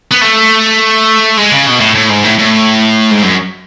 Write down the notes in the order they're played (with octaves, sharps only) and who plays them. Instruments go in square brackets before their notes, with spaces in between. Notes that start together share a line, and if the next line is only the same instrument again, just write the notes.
[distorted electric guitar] B3
A3
G#3
C#3
B2
A2
A2
G#2
A2
A2
G#2
F#2